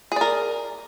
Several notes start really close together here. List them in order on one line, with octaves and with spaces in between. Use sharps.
G#4 D5 A#4